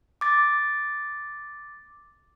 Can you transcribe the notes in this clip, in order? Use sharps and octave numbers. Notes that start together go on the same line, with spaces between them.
D6 A6